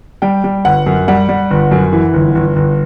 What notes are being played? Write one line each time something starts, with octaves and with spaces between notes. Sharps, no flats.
G3 G5
G3
G1 F#5
F#2
G3 F#5
G3
G1
F#2
E3
G1
G1
G1